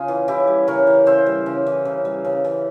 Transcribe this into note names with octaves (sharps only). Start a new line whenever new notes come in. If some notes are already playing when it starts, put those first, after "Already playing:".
Already playing: C#3 F4 G#4
E3
C#3 E4 G4
G3
C#3 A#4 C#5
E3
C#3 C5 E5
G3
C#3
E3
C#3
G3
C#3
E3